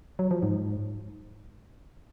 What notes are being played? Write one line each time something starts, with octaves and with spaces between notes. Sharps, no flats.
F#3
F3
G#2